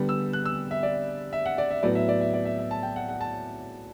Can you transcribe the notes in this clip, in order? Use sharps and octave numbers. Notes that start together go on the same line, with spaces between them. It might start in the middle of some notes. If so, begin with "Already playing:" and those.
Already playing: D3 G3 B3
E6
F#6
E6
E5
D5
E5
F#5
D5
E5
A2 F#3 B3 D5
E5
D5
E5
D5
E5
E5
A5
G5
F#5
F#5
A5